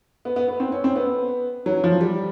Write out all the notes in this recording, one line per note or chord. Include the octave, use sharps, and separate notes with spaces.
B3
B3
B3
C4
C#4
C4
B3
F#3
F3
G3